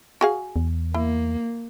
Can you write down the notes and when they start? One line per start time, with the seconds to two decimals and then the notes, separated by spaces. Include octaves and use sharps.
0.21 F#4 G#4 F5
0.56 E2
0.94 A#3 E4